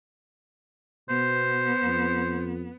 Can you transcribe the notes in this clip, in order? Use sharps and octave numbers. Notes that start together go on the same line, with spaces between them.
B2 B3 C5
F2